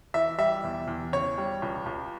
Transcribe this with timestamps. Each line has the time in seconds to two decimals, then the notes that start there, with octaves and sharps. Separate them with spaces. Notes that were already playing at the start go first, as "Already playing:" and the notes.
0.14 E3 E5
0.38 G3 E5
0.64 E2
0.87 E2
1.12 C#3 C#5
1.38 G3
1.62 C#2
1.86 C#2